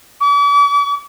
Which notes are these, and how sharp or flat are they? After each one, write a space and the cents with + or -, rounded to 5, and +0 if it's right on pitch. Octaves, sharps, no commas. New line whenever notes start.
D6 -45